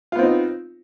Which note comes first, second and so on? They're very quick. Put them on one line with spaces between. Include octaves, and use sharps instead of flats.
F4 B3 C4 D#4